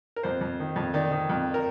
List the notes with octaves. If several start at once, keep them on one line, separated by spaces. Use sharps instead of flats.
A#4
F2 C5
F2
D#3
F2
D#3 D5
D#3
F2
A#4